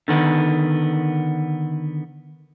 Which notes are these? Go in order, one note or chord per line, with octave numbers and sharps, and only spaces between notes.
D3 D#3 B3